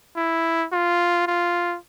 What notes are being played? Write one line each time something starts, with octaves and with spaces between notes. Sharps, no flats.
E4
F4
F4